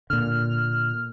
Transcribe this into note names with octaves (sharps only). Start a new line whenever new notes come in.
A#2 D3 F6